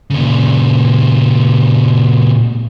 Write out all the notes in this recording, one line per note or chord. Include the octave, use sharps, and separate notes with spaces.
A#2 C#3